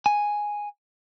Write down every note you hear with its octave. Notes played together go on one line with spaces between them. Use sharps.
G#5